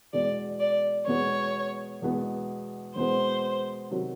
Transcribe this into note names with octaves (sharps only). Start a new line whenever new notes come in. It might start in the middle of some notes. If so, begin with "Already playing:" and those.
E2 B2 G#3 B3 D5
D5
E2 B2 G#3 B3 C#5
E2 B2 G#3 B3
E2 B2 G#3 B3 C5
C3 D#3 F#3